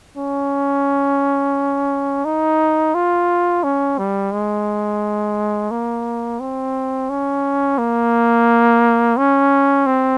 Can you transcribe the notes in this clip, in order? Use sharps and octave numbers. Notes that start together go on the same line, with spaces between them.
C#4
D#4
F4
C#4
G3
G#3
A#3
C4
C#4
A#3
C#4
C4